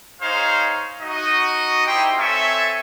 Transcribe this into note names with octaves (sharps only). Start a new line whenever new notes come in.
D#4 G#4 C5 C#5 F5 C6
D#4 F#4 D#5
D#4 E4 G4 C5 G5 C6
C4 A4 C#5 E5 G#5 C#6